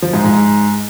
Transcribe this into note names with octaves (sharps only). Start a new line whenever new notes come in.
F3
G#2
G#2